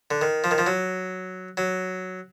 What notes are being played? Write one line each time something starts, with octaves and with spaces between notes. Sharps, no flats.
D3
D#3
F3
D#3
F3
F#3
F#3